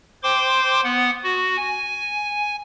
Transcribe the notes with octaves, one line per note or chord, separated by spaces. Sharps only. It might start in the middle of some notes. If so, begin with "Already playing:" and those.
C5 G5 C6 D6
B3 F#5
F#4
G#5